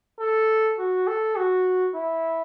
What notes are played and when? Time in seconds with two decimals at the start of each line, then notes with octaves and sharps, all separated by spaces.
0.20 A4
0.78 F#4
1.07 A4
1.36 F#4
1.95 E4